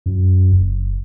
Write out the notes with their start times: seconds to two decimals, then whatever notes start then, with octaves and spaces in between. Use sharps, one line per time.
0.06 F#2
0.52 F#1